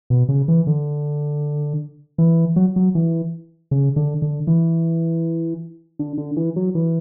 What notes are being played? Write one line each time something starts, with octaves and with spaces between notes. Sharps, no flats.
B2
C#3
E3
D3
E3
F#3
F#3
E3
C#3
D3
D3
E3
D3
D3
E3
F#3
E3